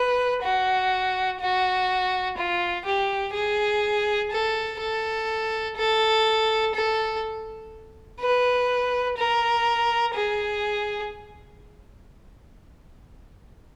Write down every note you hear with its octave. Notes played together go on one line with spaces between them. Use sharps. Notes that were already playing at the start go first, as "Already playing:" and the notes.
Already playing: B4
F#4
F#4
F4
G4
G#4
A4
A4
A4
A4
B4
A#4
G#4